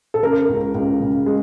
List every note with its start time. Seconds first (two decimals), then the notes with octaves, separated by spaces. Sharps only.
0.14 A4
0.23 C#3 A#4
0.49 C#2
0.75 C#2
1.00 C#3
1.26 G#3